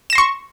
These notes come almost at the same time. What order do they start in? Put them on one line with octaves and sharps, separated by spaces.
E7 A#6 C6 C#6